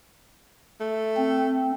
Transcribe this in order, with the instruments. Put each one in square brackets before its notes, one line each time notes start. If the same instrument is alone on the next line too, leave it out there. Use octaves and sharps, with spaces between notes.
[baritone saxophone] A3
[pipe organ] C4